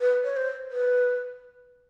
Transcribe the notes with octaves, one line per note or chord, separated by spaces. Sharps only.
B4
C#5
C5
B4